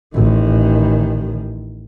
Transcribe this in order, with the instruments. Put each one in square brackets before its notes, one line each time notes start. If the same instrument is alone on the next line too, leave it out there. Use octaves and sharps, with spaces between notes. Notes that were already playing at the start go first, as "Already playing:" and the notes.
[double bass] A1 D#3